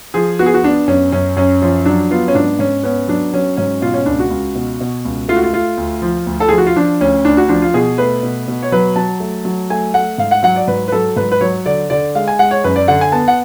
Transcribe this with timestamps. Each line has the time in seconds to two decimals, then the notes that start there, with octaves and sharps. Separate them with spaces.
0.14 F3 G#4
0.39 B3 F#4
0.46 G#4
0.54 F#4
0.63 B3 D4
0.88 F#2 C#4
1.12 F#2 C#4
1.36 F#2 C#4
1.62 F3 C#4
1.85 F#3 D4
2.11 B3 F4
2.28 C#4
2.35 G#2 D4
2.59 G#2 C#4
2.83 B3 C#4
3.08 F#3 D4
3.34 F#3 C#4
3.57 G#2 C#4
3.82 B2 F4
3.94 C#4
4.06 C#2 D4
4.19 F#4
4.30 C#2
4.55 B2
4.81 B2
5.05 C#2
5.29 A3 F4
5.36 F#4
5.43 F4
5.53 A3 F4
5.77 D2
6.02 F3
6.26 D2
6.40 A4
6.49 F3 G#4
6.58 F#4
6.67 F4
6.76 F3 D4
7.01 D2 C#4
7.25 D2 D4
7.37 F#4
7.49 F3 D4
7.62 F4
7.74 B2 G#4
7.98 A3 B4
8.23 B2
8.48 B2
8.62 C#5
8.72 F#3 B4
8.96 F#3 A5
9.20 A3
9.45 F#3
9.70 A3 G#5
9.94 A3 F#5
10.18 G#2 F5
10.31 F#5
10.43 F#3 F#5
10.56 D5
10.68 G#2 B4
10.88 B4
10.92 F#3 A4
11.16 G#2 B4
11.32 B4
11.41 F#3 C#5
11.66 D3 D5
11.90 D3 D5
12.15 G#3 F5
12.28 G#5
12.39 G#3 F#5
12.51 C#5
12.64 F#2 B4
12.76 D5
12.88 D3 F#5
13.01 G#5
13.12 B3 A5
13.28 F#5